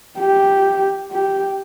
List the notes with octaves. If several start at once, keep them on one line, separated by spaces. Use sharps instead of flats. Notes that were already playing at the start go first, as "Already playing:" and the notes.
G4
G4